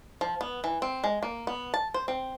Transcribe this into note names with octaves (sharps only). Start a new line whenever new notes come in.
F3
B3
E3
C4
G#3
A#3
B3
A5
C5
C4